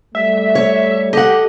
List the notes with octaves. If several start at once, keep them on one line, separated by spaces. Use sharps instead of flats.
G3 A3 E5
C#5
G4 A4 D#5 F#5